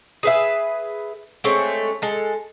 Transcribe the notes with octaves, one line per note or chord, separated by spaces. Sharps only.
G#4 B4 E5
G#3 A3 C4 C#5
G#3 A4